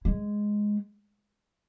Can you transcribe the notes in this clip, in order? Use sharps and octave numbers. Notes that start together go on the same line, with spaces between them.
G#3